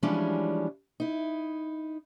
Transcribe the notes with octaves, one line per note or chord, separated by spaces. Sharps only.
E3 F3 G3 G#3 C#4 D4
D#4 E4